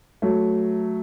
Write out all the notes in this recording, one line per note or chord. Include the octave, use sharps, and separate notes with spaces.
F#3 A3